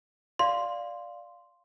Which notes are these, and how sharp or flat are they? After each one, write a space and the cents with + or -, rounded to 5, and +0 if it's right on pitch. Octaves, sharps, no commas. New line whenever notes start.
D5 +0 F5 +5 C6 +0